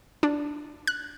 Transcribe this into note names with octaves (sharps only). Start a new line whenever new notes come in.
D4
F#6